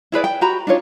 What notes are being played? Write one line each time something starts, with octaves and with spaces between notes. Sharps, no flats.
E4 G#4 B4 D5
G5
F#4 G4 A#5 B5
D4 D#4 F4 C#5